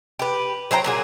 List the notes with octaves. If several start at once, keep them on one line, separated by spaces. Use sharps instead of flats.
G4 B4
F#3 C5 G5 A#5
A#2 F#3 G#4